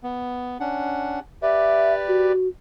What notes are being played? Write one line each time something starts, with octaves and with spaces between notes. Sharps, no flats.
B3
C#4 D4 F#5
G4 B4 D5 E5
F#4